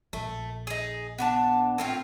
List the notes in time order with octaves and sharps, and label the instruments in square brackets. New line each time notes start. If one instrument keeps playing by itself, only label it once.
[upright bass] A#1 [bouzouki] A3
[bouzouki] D#4 G#4
B3 D4 A5
A2 C4 F4